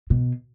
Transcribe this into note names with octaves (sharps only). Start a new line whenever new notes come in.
B2